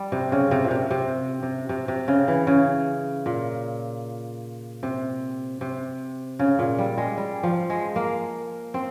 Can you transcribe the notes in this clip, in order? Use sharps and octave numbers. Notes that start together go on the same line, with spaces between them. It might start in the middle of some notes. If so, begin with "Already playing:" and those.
Already playing: G3
C3
C#3
C3
A#2
C3
C3
C3
C3
C3
C#3
E3
C#3
A#2
C3
C3
C#3
A#2
G3
G#3
G3
F3
G#3
A#3
C4